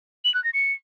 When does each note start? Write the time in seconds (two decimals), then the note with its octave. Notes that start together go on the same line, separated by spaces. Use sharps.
0.25 F#7
0.34 F#6
0.44 A#6
0.54 C#7